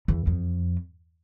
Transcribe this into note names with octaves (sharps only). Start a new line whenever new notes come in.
E2
F2